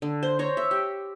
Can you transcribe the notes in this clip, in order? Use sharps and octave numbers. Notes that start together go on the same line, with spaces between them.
D3
C5
C5 C#5 A#5
E5
G4